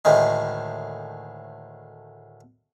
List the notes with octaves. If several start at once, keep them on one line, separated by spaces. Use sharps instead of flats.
D2 A2 D#3 G#3